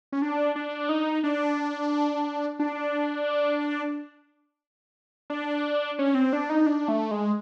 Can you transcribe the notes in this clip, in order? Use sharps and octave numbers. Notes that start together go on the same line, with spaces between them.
C#4
D4
D4
D#4
D4
D4
D4
C#4
C4
D4
D#4
D4
A3
G#3